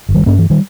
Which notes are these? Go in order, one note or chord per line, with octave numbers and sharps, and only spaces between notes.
G1
D#3 G3
G2 A#3 C#4
E3
D#3 G3